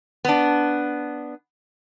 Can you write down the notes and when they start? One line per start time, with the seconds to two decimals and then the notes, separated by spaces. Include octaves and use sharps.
0.25 B3 D4